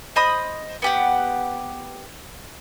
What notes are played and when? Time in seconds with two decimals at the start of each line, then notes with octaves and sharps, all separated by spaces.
0.16 C5 D#5 B5 D#6
0.82 B3 G4 F#5